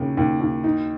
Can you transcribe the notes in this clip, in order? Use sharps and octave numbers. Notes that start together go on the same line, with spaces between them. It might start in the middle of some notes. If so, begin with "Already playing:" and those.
Already playing: D#2 C#3
D#2
D#2
D#4